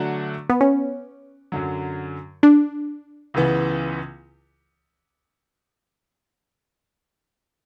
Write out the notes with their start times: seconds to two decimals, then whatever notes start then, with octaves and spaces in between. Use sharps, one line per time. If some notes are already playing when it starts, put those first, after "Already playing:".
Already playing: D3 F#3 A3 D4 F#4
0.50 B3
0.61 C#4
1.52 F#2 D3 F#3
2.43 D4
3.34 C#2 C#3 E3 B3